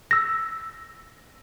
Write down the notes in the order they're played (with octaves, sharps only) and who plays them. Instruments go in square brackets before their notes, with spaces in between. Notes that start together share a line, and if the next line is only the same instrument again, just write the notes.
[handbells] E6 A#6